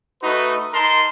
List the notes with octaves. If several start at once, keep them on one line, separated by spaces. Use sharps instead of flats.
A3 D#4 F#4 B4 D#5
D#4 A#4 A5 C6